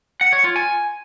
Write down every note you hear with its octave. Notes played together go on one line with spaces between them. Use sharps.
F#5
C#5
F4
G#5